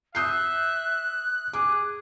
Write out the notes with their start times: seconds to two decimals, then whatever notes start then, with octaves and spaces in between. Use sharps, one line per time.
0.15 E5 D#6 F#6 G6 C7
1.53 G#4 D6